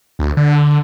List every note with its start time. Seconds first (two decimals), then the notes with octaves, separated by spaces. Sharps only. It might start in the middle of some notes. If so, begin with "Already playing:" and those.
0.19 D2
0.37 D3
0.56 D3